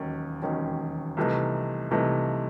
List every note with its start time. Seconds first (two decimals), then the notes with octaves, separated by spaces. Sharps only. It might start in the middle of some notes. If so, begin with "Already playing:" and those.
Already playing: E1 D#2 D#3 F#3 C#4
0.42 E1 D#2 D#3 F#3 C#4
1.17 C2 C3 E3 A3 D#4
1.91 C2 C3 E3 A3 D#4